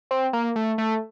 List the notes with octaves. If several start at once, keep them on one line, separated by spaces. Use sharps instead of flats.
C4
A#3
A3
A3